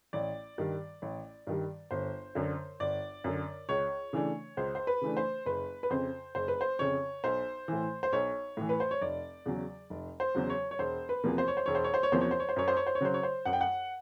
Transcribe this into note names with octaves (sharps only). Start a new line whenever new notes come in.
A1 D5
G2 D#3 G3
A1
G2 D#3 G3
G1 C5
F#2 D3
G1 D5
F#2 D3
C#2 C#5
C#3 E3 A3 D4
C#2 C5
C5
B4
C#3 E3 A3 D4
C5
F#1 B4
B4
F2 C#3 C5
F#1 C5
B4
C5
F2 C#3 C#5
B1 C5
A2 E3
C5
B1 C#5
A2 E3
B4
C5
C#5
F1 D5
E2 C#3 F#3
F1
C5
E2 C#3 F#3
C#5
C#5
E1 C5
B4
E2 C3 F3 A#3
C5
C#5
C5
E1 C#5
C5
C#5
C5
C#5
E2 C3 F3 A#3 C5
C#5
C5
C#5
C5
F#2 C#5
C5
C#5
C5
C#5
C#3 F#3 C5
C#5
C5
F#2 F#5
G5
F#5